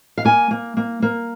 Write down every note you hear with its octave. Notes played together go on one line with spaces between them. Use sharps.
F5
A#3 G#5
A#3
A#3
A#3